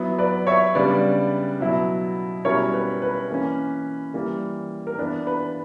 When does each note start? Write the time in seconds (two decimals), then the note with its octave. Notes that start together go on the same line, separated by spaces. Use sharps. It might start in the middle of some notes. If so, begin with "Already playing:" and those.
Already playing: F#3 B3 E4
0.18 B4 D5
0.47 C#5 E5
0.75 C#3 G3 B3 D4 B4 D5
1.60 B2 F#3 B3 E4
2.45 B2 G3 C#4 E4 A#4 C#5
2.74 B4
3.02 B4
3.30 E3 A#3 C#4
4.14 E3 G3 A#3
4.87 A#4
4.98 E3 B3 D4 B4
5.27 B4